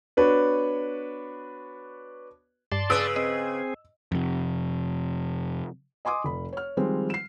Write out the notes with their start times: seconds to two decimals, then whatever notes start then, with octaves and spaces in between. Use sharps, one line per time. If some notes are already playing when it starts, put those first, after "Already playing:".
0.17 B3 D4 F#4 B4 C#5
2.72 G2 D5 A5 C6
2.90 C#3 B4 D#6 E6 D7
3.16 C4 G#4 D#5
4.12 F2 C3
6.05 D#5 G#5 C6 D6 D#6
6.24 F1 B5
6.53 C#5 F6
6.77 D#3 F3 G3 G#3 C4
7.10 C7 E7